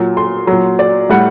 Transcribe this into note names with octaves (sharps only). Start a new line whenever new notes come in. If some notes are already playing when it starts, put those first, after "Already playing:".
Already playing: A#2 F#3
C6
A#2 F#3
D5
A2 G3 F#5